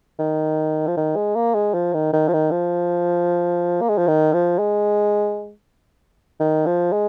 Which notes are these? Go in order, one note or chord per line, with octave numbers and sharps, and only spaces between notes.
D#3
F3
D#3
G#3
A#3
G#3
F3
D#3
D#3
F3
D#3
F3
A#3
G#3
F3
D#3
F3
G#3
D#3
F3
G#3